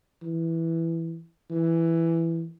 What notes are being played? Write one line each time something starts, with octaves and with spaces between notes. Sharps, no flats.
E3
E3